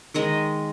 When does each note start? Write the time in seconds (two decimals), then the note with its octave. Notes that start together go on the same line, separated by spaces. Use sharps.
0.14 D#3 G#3 D#5